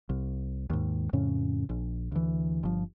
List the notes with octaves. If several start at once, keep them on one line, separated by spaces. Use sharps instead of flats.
C2
D#2 G#2
F2 A2 C#3 C#4
A#1
D2 E3
G1 F3